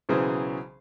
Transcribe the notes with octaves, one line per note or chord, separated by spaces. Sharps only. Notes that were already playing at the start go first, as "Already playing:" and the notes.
B1 C#3 E3 F#3 G#4 C5